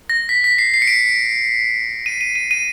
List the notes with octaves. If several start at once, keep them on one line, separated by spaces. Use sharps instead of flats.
A#6
B6
B6
C7
C7
C#7
D7
D#7
D#7
D#7
D#7